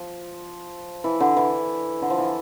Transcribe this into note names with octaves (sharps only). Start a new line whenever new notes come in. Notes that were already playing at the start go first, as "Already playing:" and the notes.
Already playing: F3
E3
D3
E3
D3
F3
E3